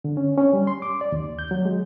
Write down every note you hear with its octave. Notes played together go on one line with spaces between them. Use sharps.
D3
C#4
C#4
G3
C6
D6
D5
D#2
G6
F#3
G#3